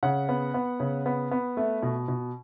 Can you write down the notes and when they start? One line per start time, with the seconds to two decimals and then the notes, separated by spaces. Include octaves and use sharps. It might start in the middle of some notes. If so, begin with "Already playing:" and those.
0.03 C#3 F#5
0.29 B3
0.54 B3
0.80 C#3
1.06 B3
1.31 B3
1.57 A3
1.82 B2
2.08 B2